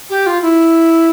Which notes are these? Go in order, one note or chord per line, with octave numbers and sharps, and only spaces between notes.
G4
F4
E4